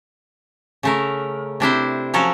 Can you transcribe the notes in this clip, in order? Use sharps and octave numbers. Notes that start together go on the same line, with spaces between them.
C#3 A3 A#4
C3 D4 E4 C5
F3 F#3 C#4 A4 A#4